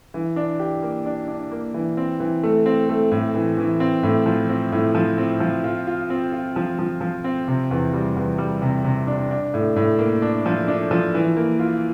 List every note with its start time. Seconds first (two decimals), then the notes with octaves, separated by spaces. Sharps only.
0.14 E3
0.36 D4
0.60 G4
0.82 A#3
1.06 D4
1.28 D4
1.52 A#3
1.74 E3
1.97 C4
2.20 E3
2.43 A3
2.66 C4
2.89 A3
3.11 A2
3.34 E3
3.58 E3
3.80 C4
4.03 A2
4.26 F3
4.49 C4
4.72 A2
4.95 F3
5.18 C4
5.40 F3
5.64 F4
5.87 F4
6.10 C4
6.33 F4
6.56 F3
6.79 F3
7.01 F3
7.24 C4
7.48 C3
7.71 E2
7.93 G3
8.16 E2
8.38 G3
8.62 C3
8.84 C3
9.07 D4
9.30 D4
9.54 A2
9.76 A2
9.99 A#3
10.22 D4
10.46 F3
10.68 D4
10.91 F3
11.14 E3
11.37 A#3
11.59 F4